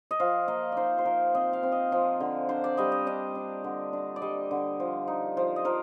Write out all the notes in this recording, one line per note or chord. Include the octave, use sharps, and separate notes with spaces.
D#5
F3 F5
A#3 D#5
D#4 C5 D5
C5
F3 A#4
C4 D#5
F5
C4
D#5
F3
D3
D4 C5
D5
G3 D#5
D#5
D4 D#5
D4
D3
D4
D5
G3 D#5
D3
F3
D#4
F3
D#5
F3 A#4